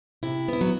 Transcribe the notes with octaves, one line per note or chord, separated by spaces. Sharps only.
C3 E4
B3 E4
F#3 F#4